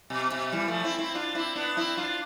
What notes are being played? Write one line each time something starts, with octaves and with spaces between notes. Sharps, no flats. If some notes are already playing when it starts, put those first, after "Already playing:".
B2
B2
E3 G3
F3 A3
C4 E4
C4 E4
D4 F4
C4 E4
B3 D4
C4 E4
D4 F4